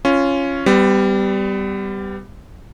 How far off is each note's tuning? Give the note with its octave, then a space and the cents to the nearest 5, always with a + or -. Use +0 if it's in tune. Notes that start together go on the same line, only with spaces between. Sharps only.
C#4 +0 F4 -15
G3 +0 B3 +35